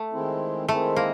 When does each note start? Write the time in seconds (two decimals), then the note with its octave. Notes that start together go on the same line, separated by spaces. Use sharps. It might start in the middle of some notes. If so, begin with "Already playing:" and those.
Already playing: A3
0.12 D#3 G#3 C4 E4
0.68 D#3 G#3 A3 C4 E4
0.96 A#3